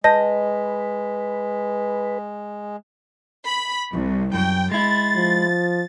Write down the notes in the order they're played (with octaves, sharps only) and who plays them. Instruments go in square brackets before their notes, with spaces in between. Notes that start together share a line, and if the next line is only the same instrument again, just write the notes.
[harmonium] G#3 [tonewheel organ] B4 [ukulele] D#5 [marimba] A5 G6 A#6
[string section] B5
C2
[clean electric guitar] F#2 [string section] G5
[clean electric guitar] G#3 E4 [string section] A6
[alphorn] F3